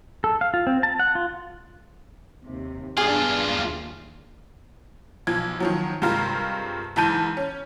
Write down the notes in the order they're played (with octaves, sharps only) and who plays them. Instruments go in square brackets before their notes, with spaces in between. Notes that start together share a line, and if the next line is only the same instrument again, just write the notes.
[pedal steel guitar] A4
F5
F4
C4
A5
F#5
F4
[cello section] D#2 C3
[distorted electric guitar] G2 F4 [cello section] B3 D4 [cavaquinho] G#4 D#6
[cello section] D#2
[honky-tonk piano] B1 F3 G#6
D#3 F3 F#3
G2 C3 G#3 F4 A#4
F#1 G#2 E3 A5 G6 D#7
C#4